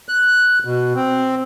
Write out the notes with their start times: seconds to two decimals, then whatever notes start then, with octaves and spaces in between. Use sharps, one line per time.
0.09 F#6
0.65 B2
0.95 C4